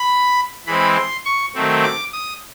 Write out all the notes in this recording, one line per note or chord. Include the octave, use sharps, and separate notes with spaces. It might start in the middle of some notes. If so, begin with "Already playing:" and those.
Already playing: B5
E3 G#3 C4 B5
C6
C#6
D#3 F#3 A3 C4
D6
D#6